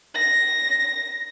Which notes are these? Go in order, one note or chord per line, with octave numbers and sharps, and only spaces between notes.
A#6